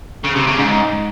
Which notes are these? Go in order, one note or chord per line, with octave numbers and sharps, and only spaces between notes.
C#3
C3
C#3
G#2